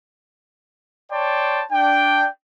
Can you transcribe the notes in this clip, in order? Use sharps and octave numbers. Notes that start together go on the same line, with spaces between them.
C#5 D5 G5 A5 C6
D4 G5